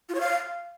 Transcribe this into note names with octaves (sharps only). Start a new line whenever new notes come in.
F4
C#5
F5